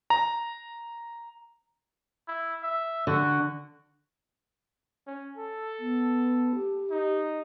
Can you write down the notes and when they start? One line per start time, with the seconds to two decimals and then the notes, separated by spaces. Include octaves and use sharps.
0.10 A#5
2.28 E4
2.63 E5
3.07 D3 F#4
5.07 C#4
5.37 A4
5.80 B3
6.55 G4
6.90 D#4